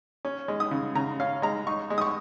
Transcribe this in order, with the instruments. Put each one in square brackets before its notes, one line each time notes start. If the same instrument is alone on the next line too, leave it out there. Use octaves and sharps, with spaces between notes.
[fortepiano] C#4
G#3
D#6
C#3
C#3 A#5
C#4 F5
G#3 A#5
D#4 C#6
G#3
D#6
C#6